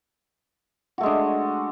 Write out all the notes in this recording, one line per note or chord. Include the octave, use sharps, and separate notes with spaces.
G#3 A3 D4 F#4